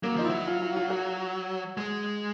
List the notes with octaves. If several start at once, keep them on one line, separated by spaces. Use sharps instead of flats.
F#3 A#3
F3 D#4
E4
F#3
F4
F4
F4
F#4
G#3